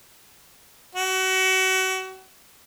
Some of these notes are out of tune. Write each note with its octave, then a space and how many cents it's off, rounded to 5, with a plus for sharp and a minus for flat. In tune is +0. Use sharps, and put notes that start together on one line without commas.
F#4 +30